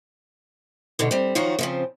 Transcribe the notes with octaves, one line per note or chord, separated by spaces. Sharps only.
G#2 B2 D3
G3 C4
D#3 F3 F#3 F4 F#4
C#3 F3 C4